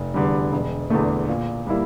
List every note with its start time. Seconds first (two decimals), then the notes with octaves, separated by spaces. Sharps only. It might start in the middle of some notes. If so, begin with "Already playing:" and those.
Already playing: F1
0.14 E2 D3 G3
0.52 E1
0.90 E2 D3 A3
1.28 A#2
1.67 G3 A#3 E4